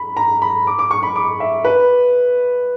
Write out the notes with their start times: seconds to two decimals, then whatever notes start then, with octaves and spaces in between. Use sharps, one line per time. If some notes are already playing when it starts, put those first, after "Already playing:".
Already playing: B5
0.17 A#5
0.42 B5
0.67 D6
0.79 D6
0.91 C#6
1.03 B5
1.16 D6
1.40 E5
1.65 B4